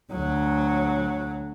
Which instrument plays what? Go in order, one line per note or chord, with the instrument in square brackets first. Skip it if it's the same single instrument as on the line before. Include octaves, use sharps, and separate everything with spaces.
[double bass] D2 F#3